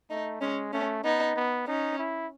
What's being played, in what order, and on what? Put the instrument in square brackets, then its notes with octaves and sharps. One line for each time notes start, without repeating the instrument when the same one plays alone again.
[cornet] A3 [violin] D#4
[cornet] G#3 [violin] C#4
[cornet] A3 [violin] C#4
[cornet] B3 [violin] D#4
[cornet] B3
[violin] C#4 [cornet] D#4
[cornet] E4